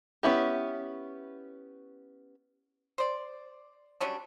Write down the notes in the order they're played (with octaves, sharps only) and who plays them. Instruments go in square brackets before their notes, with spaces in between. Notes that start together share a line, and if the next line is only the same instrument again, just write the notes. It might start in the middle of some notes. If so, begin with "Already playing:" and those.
[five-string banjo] B3 C#4 E4 G4
[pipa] C5 D5
F#3 G3 C#4 D4